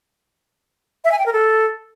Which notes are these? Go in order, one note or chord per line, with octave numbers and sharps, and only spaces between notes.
E5
G#5
G5
A#4
A4